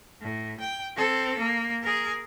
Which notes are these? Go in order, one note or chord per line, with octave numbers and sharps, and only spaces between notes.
A2
G5
C4 A4
A#3
G#4 A#4